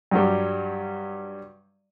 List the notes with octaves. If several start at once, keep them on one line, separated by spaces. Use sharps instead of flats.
G2 F#3 G3